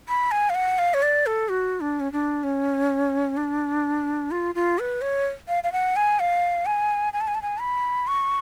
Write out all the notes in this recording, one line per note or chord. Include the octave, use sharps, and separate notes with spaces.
B5
G#5
F5
F#5
F5
C#5
D5
A4
F#4
D4
C#4
D4
C#4
D4
F4
F4
B4
C#5
F5
F5
F#5
G#5
F5
G#5
G#5
A5
G#5
A5
G#5
B5
C#6